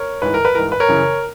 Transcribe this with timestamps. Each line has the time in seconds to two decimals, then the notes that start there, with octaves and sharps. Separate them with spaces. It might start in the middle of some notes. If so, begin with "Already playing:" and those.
Already playing: A#4 C#5
0.22 G#2 E3 B4
0.34 A#4
0.45 B4
0.55 G#2 E3 A#4
0.72 B4
0.80 A#4 C#5
0.88 F#2 C#3 E3